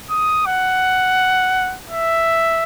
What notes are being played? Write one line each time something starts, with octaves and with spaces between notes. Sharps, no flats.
D#6
F#5
E5